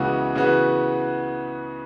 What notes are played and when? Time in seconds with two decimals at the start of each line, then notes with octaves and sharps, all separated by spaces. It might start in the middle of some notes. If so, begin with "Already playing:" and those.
Already playing: C#2 C#3 E3 B3 F#4
0.35 C#3 E3 B3 F#4 B4